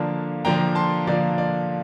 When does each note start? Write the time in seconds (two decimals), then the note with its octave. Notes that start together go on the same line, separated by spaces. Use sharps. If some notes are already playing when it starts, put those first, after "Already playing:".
Already playing: D3 F3 A#3 D4 F5 A5
0.45 D3 F3 A#3 D4 G5 A#5
0.75 A5 C6
1.07 D3 F3 A#3 D4 D5
1.38 D5